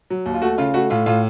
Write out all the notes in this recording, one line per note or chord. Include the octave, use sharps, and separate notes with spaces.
F#3
D#2
F4
A3 F#4
C#3 F4
A3 F#4
A2 F4
A2 F4